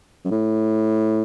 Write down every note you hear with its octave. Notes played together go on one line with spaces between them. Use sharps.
F#2
A2